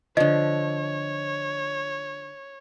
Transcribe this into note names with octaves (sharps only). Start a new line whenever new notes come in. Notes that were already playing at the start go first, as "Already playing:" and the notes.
D3 F3 C#5 D#5